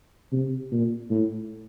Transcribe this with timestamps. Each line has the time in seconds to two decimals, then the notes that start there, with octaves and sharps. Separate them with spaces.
0.32 C3
0.72 A#2
1.10 A2